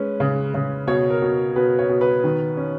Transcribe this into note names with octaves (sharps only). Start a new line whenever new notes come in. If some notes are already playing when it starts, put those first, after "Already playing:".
Already playing: G#3 C#4 B4
C#3
C#3
B2 C#5
A#4
B2
B2 B4
C#5
B2
B4
D#3
C#4